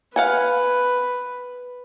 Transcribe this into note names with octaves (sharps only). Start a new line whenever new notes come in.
B4 F5 F#5 G#5